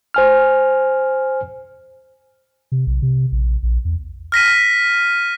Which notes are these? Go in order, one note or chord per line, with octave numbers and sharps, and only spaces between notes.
C5 G#5 F6
C3
B1
C3
A#1
A#1
E2
F6 A#6 B6 D#7